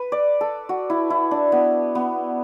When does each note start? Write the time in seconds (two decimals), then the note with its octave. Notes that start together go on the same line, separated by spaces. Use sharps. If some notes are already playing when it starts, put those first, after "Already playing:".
Already playing: B4
0.12 D5
0.41 A4
0.69 F#4
0.90 E4
1.10 E4
1.31 D4
1.52 B3
1.95 B3